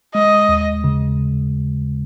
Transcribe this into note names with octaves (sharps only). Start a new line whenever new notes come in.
G#3 D#5
D#2
C#3